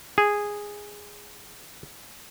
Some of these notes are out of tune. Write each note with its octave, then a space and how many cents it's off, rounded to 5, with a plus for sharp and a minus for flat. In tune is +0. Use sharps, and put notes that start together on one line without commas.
G#4 -10